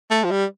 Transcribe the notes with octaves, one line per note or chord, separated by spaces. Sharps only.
A3
F3
G3